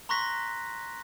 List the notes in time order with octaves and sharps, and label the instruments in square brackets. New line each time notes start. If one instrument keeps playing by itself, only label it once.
[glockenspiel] A#5 C6 C#6 F#6 A#6 B6